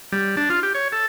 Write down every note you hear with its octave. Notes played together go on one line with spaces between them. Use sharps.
G3
D4
F4
G4
C#5
A4